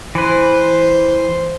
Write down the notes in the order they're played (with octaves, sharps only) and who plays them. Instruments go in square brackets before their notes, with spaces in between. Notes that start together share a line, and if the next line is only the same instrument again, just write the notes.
[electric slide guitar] E3 B4 [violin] C5